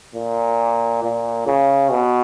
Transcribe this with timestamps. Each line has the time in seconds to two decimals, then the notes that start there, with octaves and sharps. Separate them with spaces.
0.15 A#2
1.03 A#2
1.46 C#3
1.91 B2